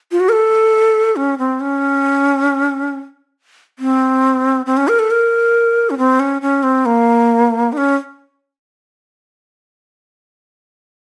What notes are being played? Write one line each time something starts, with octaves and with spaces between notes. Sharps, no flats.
F4
F#4
A#4
A4
C#4
C4
C#4
C4
C4
C#4
A#4
A4
A#4
C#4
C4
C#4
C#4
C4
A#3
D#4
C#4